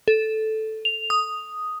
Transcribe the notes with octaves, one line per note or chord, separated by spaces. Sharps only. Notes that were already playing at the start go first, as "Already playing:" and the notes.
A4
F7
D#6